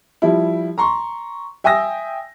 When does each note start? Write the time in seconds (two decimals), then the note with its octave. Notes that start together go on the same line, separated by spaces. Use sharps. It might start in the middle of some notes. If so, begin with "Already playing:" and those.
0.22 F3 G3 E4
0.78 A#5 C6 C#6
1.64 E5 G5 G#5 D#6 E6 A#6